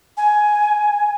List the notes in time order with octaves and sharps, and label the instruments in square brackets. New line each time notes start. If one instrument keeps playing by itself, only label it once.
[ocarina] G#5